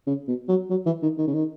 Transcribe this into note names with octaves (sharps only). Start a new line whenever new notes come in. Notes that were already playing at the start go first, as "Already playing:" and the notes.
C#3
B2
F#3
F#3
E3
D#3
D#3
C#3
D#3